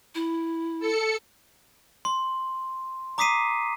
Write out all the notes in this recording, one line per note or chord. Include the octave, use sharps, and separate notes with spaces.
E4
A4 C#7
C6
A#5 D6 D#6 B6 C7 D#7